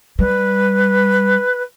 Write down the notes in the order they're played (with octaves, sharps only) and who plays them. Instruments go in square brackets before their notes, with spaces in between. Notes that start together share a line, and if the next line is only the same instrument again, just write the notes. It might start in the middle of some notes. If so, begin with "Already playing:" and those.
[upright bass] G3 [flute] B4